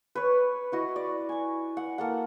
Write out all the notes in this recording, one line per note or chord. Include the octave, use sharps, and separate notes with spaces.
B4 C#5
E4 F#4 D#5
D5
G#5 C#6
F#5
A#3 A4 F#5